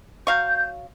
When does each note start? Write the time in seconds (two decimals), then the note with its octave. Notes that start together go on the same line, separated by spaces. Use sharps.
0.27 F#3 F5 C#6 G6